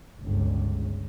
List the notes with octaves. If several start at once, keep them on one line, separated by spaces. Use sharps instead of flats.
G1 C#2